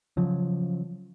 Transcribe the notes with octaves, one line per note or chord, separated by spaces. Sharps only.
C#3 F3 F#3